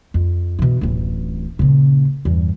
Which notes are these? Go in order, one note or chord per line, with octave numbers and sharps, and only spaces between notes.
F2
B2 E3
D1 A1
A#2 C#3
E2 G2